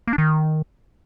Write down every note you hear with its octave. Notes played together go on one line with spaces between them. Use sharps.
A#3
D4
D#3